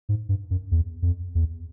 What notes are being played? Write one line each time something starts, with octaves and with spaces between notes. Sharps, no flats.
G#2
G2
F#2
E2
F2
E2